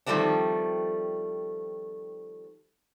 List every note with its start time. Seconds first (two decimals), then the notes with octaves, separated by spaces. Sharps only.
0.06 D#3 F3 G3 A3 C4 D4